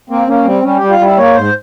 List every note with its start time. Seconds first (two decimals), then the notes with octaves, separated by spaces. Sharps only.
0.10 A#3 C4
0.27 A#3 C#4
0.45 G3 C4
0.63 G3 C#4
0.77 G3 G4
0.90 F4
0.99 G3 E4
1.17 A#3 C#5
1.35 G#2 C5